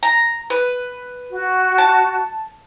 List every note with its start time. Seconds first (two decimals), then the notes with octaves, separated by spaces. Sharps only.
0.03 A#5
0.50 B4
1.32 F#4
1.78 A5